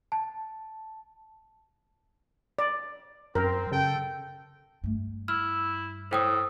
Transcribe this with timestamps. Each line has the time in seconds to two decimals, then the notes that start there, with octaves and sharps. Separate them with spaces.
0.12 A5
2.59 D5
3.35 F#2 C4 A#4
3.71 C#3 A4 G5
4.84 G2 A3
5.28 E4 F6
6.11 A2 C5 G5 D#6